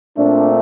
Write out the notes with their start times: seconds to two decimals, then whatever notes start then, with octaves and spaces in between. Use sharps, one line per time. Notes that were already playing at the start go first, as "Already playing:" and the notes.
0.17 A#2 A3 C4 D4